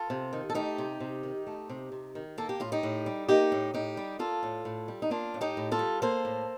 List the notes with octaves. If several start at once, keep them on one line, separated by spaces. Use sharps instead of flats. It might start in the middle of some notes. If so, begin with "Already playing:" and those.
Already playing: F4 A4
C3
D#3
A4
A3 D#4 G4
C3
C3
D#3
A3
C3
C3
D#3
A#3 A4
G4
A2 F4
D#4 G4
A2
G3
A#3 D#4 G4
A2
A2 D#4 G4
G3
A#3 F4 A4
A2
A2
G3
D#4
A#3 D4 F4
A2
D#4 G4
A2
F4 A4
G3
A#3 A4 C5
A2